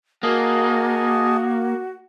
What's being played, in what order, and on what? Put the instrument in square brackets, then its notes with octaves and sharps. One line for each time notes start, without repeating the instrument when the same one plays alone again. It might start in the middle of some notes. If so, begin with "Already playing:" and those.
[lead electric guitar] A#3 [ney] F#4 [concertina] G#4 D#5 A5